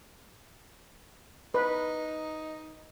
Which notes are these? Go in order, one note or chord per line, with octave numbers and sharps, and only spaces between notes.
D#4 B4